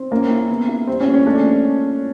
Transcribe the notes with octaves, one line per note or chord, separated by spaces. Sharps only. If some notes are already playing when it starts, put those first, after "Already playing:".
Already playing: C4
A#3 C#4
E4
B3
E4
G3 C4
C#4
A#3
C#4
A3 D4